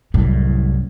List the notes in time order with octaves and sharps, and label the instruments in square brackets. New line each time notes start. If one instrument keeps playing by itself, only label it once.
[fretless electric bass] C2 F#2 A2 [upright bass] G3